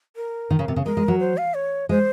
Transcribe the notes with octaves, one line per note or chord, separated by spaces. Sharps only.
A#4
D#3
C#3
C3
C#3
G#3 A#4
G#3
F#3
C5
F5
C#5
G#3 C5